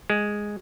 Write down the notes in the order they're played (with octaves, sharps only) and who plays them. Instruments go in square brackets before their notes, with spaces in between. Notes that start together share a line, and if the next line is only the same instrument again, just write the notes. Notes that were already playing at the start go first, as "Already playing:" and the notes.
[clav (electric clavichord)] G#3